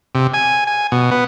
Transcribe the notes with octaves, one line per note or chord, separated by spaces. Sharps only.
C3
G#5
G#5
B2
B3